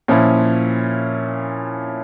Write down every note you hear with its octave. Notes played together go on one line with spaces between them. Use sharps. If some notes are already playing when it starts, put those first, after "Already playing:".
A#2 F3 C#4 E4